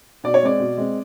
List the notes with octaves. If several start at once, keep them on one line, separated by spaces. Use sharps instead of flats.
B2 D5
C#5
G#3 C4 D5
B2
G#3 C4